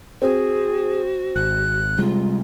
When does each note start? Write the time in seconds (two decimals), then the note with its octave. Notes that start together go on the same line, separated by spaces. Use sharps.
0.22 C4 F#4 G#4
1.36 G#1 F#6
1.98 C3 G3 G#3 F4